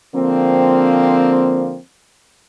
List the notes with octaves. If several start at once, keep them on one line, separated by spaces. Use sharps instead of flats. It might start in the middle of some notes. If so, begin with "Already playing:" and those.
D3 F3 A#3 C4